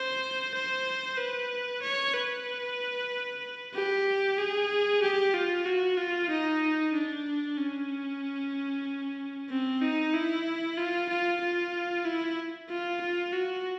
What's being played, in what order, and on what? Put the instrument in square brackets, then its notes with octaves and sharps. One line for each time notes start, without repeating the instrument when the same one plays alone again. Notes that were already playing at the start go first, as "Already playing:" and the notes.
Already playing: [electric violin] C5
C5
B4
C#5
B4
G4
G#4
G4
F4
F#4
F4
D#4
D4
C#4
C4
D#4
E4
F4
F4
F4
E4
F4
F4
F#4